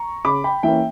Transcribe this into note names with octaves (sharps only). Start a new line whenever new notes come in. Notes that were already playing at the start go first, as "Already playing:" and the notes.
Already playing: A#5 C#6
C#3 B5 D6
G5 B5
E3 A#3 C#4 E5 G5